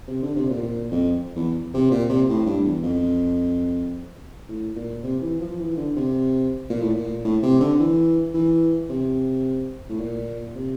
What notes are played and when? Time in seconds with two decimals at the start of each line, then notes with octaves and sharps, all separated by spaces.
0.08 C3
0.22 D3
0.36 C3
0.50 A#2
0.63 A#2
0.91 F2
1.36 E2
1.74 C3
1.91 A#2
2.10 C3
2.29 A2
2.46 G2
2.65 E2
2.83 F2
4.49 A2
4.76 A#2
5.03 C3
5.22 E3
5.41 F3
5.59 E3
5.77 D3
5.96 C3
6.70 A#2
6.82 A2
6.94 A#2
7.25 A2
7.43 C3
7.60 D3
7.80 E3
8.35 E3
8.89 C3
9.90 A2
9.99 A#2
10.55 C3